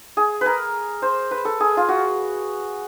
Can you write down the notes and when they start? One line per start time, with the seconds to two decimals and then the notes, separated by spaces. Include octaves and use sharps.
0.17 G#4
0.41 A#4 B4
1.02 C5
1.31 B4
1.45 A4
1.60 G#4
1.77 F4
1.88 F#4